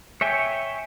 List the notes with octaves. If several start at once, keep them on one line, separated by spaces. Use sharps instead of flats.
C#5 E5 G5 G#5